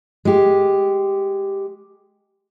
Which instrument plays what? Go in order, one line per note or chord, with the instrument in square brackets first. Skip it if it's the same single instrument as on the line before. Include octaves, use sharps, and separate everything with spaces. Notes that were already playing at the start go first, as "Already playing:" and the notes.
[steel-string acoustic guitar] G#3 G4